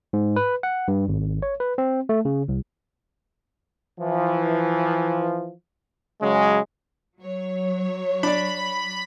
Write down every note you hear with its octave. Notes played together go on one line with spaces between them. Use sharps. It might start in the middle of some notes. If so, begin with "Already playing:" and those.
G#2
B4
F#5
G2
G#1
C#5
B4
C4
A3
C#3
C2
E3 F3
C#3 F#3 G#3
F#3 C#5
D4 D5 B5